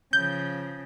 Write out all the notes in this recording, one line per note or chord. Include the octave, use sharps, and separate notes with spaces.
C#3 F3 G6